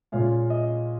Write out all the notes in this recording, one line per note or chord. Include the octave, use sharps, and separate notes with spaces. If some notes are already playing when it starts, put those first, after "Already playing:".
A#2 G#3 C#4 F4 F5
D#5